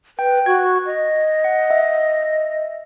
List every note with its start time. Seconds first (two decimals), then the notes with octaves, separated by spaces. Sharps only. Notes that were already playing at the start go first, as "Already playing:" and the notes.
0.19 B4 G5
0.46 F#4 G#6
0.86 D#5
1.44 F#5
1.70 E5